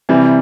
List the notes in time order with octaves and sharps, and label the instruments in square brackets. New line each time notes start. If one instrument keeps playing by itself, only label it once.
[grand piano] C3 E3 G3